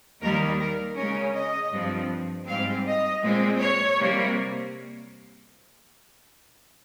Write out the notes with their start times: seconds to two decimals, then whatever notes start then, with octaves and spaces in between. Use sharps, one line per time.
0.21 D#2 D#3 G3 A#3 A#4
0.59 A#4
0.96 C#3 G#3 C#4 A#4
1.35 D#5
1.71 G2 F3 C4
2.47 G#2 G3 C4 F5
2.85 D#5
3.22 A#2 G#3 C4
3.60 C#5
3.98 C3 G3 A#3